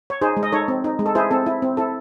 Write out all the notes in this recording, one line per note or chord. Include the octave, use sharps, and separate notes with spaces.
C#5
D#4 G#4 C5
G#3
D#5
D#4 A4 C#5
C4
D#4
G#3
A4
E4 G#4 C5
C4 A4
E4
C4
E4 A4